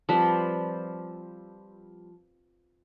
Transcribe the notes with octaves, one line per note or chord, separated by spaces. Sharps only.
F3 G3 C4 B4